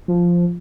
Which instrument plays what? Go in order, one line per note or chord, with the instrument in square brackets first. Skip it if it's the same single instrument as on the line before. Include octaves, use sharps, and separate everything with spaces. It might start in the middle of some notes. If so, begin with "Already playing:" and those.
[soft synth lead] F3